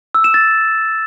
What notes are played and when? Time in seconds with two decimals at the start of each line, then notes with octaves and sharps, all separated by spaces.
0.15 E6
0.24 E7
0.34 A6